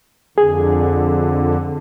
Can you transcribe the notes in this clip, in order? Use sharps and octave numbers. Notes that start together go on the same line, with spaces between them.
F2 D3 G#4